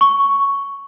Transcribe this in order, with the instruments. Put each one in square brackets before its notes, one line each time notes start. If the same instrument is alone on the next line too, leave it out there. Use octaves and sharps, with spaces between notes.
[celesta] C#6